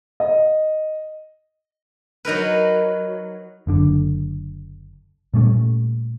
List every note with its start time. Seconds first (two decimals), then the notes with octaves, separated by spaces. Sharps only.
0.20 D#5
2.25 F#3 D#4 A#4 B4
3.67 F#1 D3 D4
5.34 A#2 G3 A3 C#4